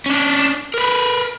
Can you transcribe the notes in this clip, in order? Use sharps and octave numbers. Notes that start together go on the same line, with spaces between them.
C#4 D4
A#4 B4